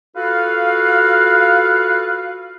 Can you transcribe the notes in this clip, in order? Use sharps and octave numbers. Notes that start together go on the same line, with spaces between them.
F4 F#4 A4 B4 F5